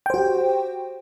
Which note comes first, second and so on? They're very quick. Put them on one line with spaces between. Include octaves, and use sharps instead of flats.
G5 C5 F#4 G4